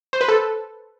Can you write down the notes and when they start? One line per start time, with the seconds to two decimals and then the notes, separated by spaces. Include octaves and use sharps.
0.13 C5
0.21 B4
0.28 A4